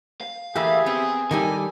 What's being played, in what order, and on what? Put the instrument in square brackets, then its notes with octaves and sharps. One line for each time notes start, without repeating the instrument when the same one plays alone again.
[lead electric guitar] F5
[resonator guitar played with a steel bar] E3 A3 A#3 [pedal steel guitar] G4 E5 B5 [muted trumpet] G#4
[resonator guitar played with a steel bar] B3 [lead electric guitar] C4
[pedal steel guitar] D#3 G3 A4 [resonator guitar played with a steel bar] A#3 D#4 G4 [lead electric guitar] G#5